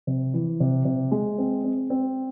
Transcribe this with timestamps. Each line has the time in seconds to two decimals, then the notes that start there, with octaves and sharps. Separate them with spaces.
0.07 C3
0.34 E3
0.60 C3
0.85 C3
1.11 G#3
1.38 C4
1.64 C4
1.90 C4